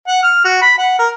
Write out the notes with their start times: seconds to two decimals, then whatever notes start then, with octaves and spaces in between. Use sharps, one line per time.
0.08 F#5
0.23 F6
0.44 F#4
0.62 B5
0.78 F#5
0.99 A#4